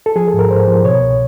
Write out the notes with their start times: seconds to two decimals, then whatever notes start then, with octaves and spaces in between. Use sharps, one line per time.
0.06 A4
0.16 F3 G#4
0.28 A4
0.33 G#2
0.39 A#4
0.50 G#2 C5
0.68 F3
0.84 B2 C#5
1.01 C2